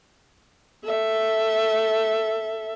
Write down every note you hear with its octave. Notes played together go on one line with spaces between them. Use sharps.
A4 E5